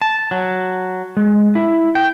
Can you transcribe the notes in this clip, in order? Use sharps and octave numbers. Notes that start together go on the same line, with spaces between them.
A5
F#3
G#3
E4
G5